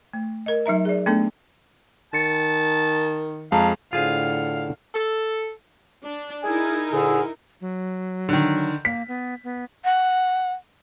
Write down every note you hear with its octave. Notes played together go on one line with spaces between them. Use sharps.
A3
A#4 D#5
F#3 D#4 E5 A#5
G#4 D5
A3 B3 D4 A4
D#3 A5 A6 C#7
F2 G#3 F5 A5 A#5
A2 D3 F4 G#4 C5 F5
A4
D4
D#4 E4 G#4 A#4 G#5
D2 A#2 D3 G#4
F#3
D3 D#3
A#3 B6
B3
B3
F#5